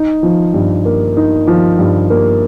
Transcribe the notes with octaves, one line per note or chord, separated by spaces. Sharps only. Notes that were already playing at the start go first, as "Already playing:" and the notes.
Already playing: D#4
F3
G2
A#3
D#4
F3
G2
A#3